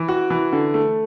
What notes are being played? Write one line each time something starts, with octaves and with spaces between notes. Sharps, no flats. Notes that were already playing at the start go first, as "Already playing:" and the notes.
Already playing: E3
F#4
E3
D3
A3